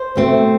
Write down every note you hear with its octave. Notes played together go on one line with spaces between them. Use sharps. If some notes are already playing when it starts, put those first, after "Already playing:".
Already playing: C5
B2 A3 C4